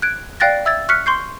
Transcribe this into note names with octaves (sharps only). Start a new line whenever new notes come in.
F#6 G#6 D7
D5 F5 G5 F#6 A6 A#6
E5 E6 G#6 A6
C#6 F6 F#6 B6 C#7
C6 C#6 G6 C7